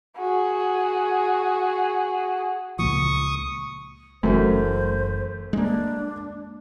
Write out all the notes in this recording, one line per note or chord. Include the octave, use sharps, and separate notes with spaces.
F#4 G#4
C#2 A#2 F3 C#6 D#6
F#1 F#2 E3 A3 C#4 C5
G#3 A#3 D4